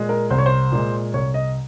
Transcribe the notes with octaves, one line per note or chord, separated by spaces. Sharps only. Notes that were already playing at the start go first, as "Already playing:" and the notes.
Already playing: A#2 G#3
A#4
C2 C5
C#5
C5
A#2 G#3
C2 C#5
D#5